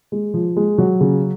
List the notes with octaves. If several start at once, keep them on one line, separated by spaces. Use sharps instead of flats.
G#3
F3
G#3
F#3
C#3